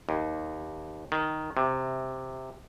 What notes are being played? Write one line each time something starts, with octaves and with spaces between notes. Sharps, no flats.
D#2
D#3
C3